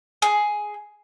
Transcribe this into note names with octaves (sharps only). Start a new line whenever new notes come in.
G#4